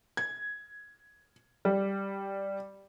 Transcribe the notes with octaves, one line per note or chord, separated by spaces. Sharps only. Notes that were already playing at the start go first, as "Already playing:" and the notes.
G#6
G3